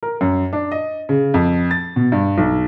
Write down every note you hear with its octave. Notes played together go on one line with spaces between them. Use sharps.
A#4
F#2
D4
D#5
C#3
F2
A6
B2
G2
B1